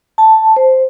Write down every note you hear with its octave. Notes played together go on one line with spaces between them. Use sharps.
A5
C5